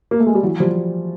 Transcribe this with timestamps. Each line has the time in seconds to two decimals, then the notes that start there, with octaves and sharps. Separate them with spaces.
0.11 A#3
0.20 A3
0.27 G#3
0.35 G3
0.43 E3 F#3
0.60 F3 G3